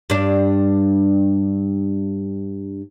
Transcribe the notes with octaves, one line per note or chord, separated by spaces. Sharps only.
G2 D4